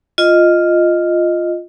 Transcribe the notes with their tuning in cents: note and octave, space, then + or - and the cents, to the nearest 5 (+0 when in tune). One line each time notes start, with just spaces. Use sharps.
F4 +0 D#5 +0